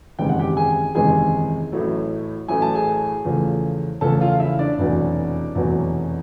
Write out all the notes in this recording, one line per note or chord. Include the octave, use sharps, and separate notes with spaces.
F#1 E2 C3 D#3 G#3 G5
F#5
G4 G5
G#4 G#5
F#1 E2 C3 D#3 G#3 G#4 G#5
A1 A2 F#3 A3
A1 A2 F#3 A3 G#5
A5
G#4 G#5
E2 C#3 F3 A3
E2 C#3 F3 A3 A4 A5
F4 F5
E4 E5
D4 D5
F1 E2 B2 F#3
F1 E2 B2 F#3